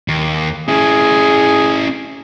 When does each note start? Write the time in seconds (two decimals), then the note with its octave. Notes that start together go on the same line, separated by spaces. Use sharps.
0.08 D#2
0.68 C#4 E4 G#4